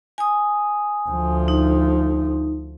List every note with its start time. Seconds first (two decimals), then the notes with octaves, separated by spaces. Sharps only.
0.18 G#5 D#6
1.09 D2 F3
1.48 D#4